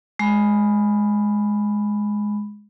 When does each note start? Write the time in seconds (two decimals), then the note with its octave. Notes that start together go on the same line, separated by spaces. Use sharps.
0.19 G#3 B5